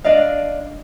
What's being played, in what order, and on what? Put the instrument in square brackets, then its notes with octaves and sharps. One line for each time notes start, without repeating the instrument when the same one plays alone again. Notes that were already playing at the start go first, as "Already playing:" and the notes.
[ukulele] D4 D5 D#5 F5